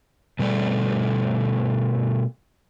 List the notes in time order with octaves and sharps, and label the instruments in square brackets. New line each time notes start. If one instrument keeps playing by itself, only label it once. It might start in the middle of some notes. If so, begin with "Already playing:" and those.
[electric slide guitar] B2 G3 A3 D5